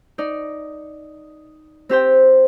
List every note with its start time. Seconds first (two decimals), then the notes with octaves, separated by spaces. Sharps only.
0.18 D#4 D5
1.89 C4 G4 C5 G5